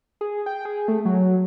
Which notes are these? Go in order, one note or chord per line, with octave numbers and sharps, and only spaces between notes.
G#4
G5
G#4
A3
F#3